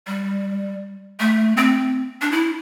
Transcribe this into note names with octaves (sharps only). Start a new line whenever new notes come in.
G3
A3
C4
D4
E4